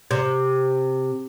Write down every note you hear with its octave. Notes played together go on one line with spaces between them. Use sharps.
C3